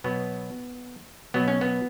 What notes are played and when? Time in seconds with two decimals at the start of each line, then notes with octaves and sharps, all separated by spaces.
0.04 B2 F#3 B3
1.34 B2 F#3 B3
1.48 C#4
1.61 B3